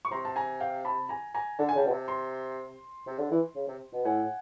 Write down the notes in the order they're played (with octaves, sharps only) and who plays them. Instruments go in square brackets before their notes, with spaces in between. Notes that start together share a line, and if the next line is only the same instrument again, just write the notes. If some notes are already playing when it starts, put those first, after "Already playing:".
[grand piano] C#6
[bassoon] C3 [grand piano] A#5 C6
[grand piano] A5
G#5 A#5
F5 G5
A5 B5
G#5 A#5
G#5 A#5
[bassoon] D3 [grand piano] A5
[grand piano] G#5
[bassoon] C#3 [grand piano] G5 A5
[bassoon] B2
C3
[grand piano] A#5 C6
[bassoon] C3
D3
E3
C#3
C3
B2
[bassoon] A2 [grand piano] F#5 G#5